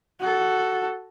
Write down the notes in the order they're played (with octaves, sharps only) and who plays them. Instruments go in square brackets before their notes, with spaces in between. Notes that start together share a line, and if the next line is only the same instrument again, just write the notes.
[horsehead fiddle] F#4 A4